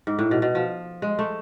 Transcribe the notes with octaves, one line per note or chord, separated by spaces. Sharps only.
G#2
A2
B2
B2
F3
G#3
A3